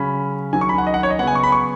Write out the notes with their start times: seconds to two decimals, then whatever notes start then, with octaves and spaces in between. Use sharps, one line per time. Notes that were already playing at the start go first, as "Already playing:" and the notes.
Already playing: C#3 F#3 C#4 B5
0.53 D#3 F#3 C#4 G#5
0.61 C#6
0.69 B5
0.78 F#5
0.87 D#5
0.94 F#5
1.03 C#5
1.10 D#5
1.19 C#3 F#3 B3 F#5
1.27 G#5
1.35 C#6
1.43 B5
1.52 C#6